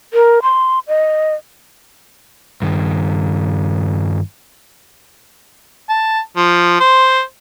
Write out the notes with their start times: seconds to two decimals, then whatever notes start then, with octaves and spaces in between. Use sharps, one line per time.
0.14 A#4
0.43 C6
0.88 D#5
2.62 G2 D#3
5.89 A5
6.37 F3
6.80 C5